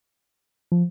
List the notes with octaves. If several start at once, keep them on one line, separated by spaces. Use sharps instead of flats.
F3